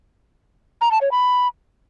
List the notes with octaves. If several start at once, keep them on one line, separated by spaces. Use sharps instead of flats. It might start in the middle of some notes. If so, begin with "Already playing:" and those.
A#5
A5
C#5
B5